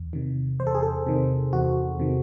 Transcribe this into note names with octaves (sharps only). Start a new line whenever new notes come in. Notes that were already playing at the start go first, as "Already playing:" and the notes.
Already playing: E2
C3 D#3
E2 C5
A4
G#4
A4
C3 D#3
E2 F#4
C3 D#3